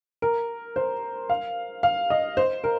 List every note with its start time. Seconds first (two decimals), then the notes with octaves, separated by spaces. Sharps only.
0.22 A#4
0.76 C5
1.30 F5
1.83 F5
2.10 D#5
2.37 C5
2.64 A#4